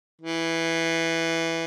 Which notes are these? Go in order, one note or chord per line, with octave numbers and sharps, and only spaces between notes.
E3